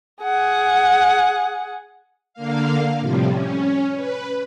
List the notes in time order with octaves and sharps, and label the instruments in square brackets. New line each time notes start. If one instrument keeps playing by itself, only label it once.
[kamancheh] G#4 F#5
[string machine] D3 A#3 F5
A2 C3 F3 G3
C#4
B4